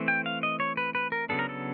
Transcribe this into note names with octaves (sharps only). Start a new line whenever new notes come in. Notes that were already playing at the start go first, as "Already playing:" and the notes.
Already playing: E3 A3 C4
G5
F5
D#5
C#5
B4
B4
A#4
C#3 F#3 B3 D4 A4
A#4
A4